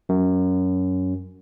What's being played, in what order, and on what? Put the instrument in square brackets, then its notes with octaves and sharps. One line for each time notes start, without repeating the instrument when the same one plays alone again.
[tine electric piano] F#2